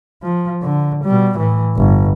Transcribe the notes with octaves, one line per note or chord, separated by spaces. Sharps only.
F3
D3
B2 G3
A2 E3
G1